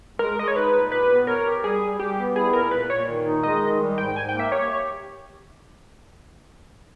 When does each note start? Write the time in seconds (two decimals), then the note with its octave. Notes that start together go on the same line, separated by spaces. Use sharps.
0.19 G#3 A#4
0.38 G#3 D#5
0.48 C#5
0.56 D#4 B4
0.73 A#2
0.91 G4 B4
1.10 B3
1.27 A#4 C#5
1.45 G4
1.64 G3 G#4
1.82 G3
2.00 G3 G4
2.18 B3
2.36 E4 G#4
2.53 A#2 A#4
2.71 A#2 B4
2.90 A#2 C#5
3.08 D#3
3.26 D#4
3.43 G#3 D#5
3.62 D#3
3.80 G3
3.98 G#2 G5
4.16 G#2 G#5
4.29 G5
4.34 A#3
4.40 E5
4.52 G4 C#5